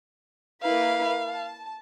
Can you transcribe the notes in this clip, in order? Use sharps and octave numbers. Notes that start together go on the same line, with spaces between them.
A#3 E4 B4 F5
A5